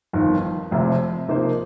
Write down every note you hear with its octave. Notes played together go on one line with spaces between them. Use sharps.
G1 F2 D#3
F1 F2 C3
C3 F3 A#3 D#4 C5